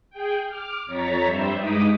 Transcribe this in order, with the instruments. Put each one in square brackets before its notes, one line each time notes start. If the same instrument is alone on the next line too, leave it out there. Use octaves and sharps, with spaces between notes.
[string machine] G#4 G5
D6 F6
F2 C#5 A#5 A6 B6
G2 G3 C5 E5
G2 G#3 D#4 D6 D#6 B6